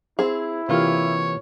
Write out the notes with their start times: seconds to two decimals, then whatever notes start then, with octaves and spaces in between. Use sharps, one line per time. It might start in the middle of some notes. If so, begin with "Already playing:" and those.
0.19 C4 E4 G#4
0.69 C3 E3 A#3 F4 G4 G#4 C#5